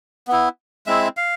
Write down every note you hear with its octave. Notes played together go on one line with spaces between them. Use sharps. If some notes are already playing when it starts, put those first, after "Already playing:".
B3 E4
G#3 C4 E4 E5
F5